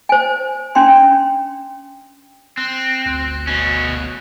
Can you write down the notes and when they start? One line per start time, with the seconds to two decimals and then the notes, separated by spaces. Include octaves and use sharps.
0.09 C5 G#5
0.75 C#4 D4 G5 C6
2.57 C4 F#6
3.06 G1 D2 F#6
3.47 B2 C#4